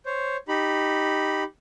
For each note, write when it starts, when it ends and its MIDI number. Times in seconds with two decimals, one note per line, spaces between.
0.06 0.37 72
0.06 0.37 73
0.48 1.43 63
0.48 1.43 67
0.48 1.43 83